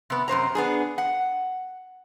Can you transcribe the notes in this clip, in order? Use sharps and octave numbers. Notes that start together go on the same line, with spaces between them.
C3 B3
F#2 C3 C5 A#5
B3 D4 G#4
F#5